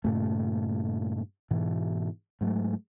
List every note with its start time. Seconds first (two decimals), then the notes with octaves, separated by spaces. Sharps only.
0.04 G2 A#2 C#3 A3
1.51 G#2 B2 E3
2.41 G#2 F#3 A3